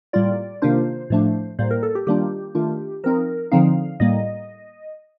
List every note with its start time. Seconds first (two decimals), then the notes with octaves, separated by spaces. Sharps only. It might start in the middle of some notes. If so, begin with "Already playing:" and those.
0.13 A2 G3 A#3 F4 D5
0.62 C3 D#3 A#3 D4 F4 C5
1.10 A2 F3 A3 D4
1.59 A2 G3 A#3 C5
1.71 A#4
1.83 A4
1.95 G4
2.07 D#3 G3 A#3 D4 F4 G4
2.55 D#3 A3 D4 F4
3.04 F3 C4 D#4 A#4
3.51 D3 F3 C4 D#4 F5
4.00 A2 G3 A#3 D#5